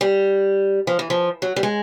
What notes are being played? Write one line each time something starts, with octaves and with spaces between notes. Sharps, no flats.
G3
F3
E3
F3
F#3
G3
G#3